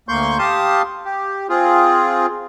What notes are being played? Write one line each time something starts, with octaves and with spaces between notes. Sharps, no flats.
D2 A#3 C6 C#6 G6
G4 F5 A5 C6 D#6
G4
C4 F4 G#4